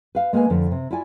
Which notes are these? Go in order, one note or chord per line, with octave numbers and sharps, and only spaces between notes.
B4 F5
G#3 A#3 B4 F#5 G#5
F2 D3
C3
E4 F4 D5 G#5